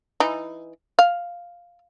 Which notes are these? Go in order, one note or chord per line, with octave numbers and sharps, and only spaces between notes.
E3 D#4
F5